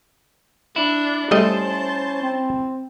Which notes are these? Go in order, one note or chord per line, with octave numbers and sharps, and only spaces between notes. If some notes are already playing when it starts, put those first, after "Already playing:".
D4 E4
G3 A3 C#4 C5 D#5 A5
C4